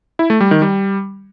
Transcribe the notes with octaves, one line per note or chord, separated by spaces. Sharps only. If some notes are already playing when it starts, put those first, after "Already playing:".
E4
A3
G3
D#3
G3